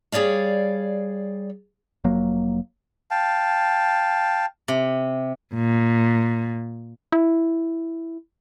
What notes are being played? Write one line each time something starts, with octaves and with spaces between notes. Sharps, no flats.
G3 G#4 C#5 D5 F5
F1 F#3 A#3
F5 G5 A5
C3
A#2
E4